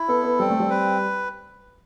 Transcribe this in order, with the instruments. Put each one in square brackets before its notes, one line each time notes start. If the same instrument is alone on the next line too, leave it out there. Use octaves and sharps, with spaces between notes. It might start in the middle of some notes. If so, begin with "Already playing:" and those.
Already playing: [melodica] E4
[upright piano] B3 [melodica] A4
[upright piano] B3
[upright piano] G3 [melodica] C4
[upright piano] A3
G3
[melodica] B4